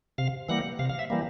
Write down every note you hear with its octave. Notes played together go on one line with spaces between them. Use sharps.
C3 F5
E3 G3 A#3 F#5
C3 F5
F5
E5
E3 G3 A#3